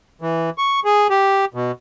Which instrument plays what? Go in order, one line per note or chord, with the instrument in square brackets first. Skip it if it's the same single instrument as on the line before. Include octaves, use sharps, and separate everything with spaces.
[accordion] E3
C#6
G#4
G4
B2